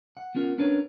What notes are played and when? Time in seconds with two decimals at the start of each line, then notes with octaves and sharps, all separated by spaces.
0.17 F#5
0.35 B3 C#4 F4 A#4 F#5
0.58 B3 C#4 D4 A#4 B4 C#5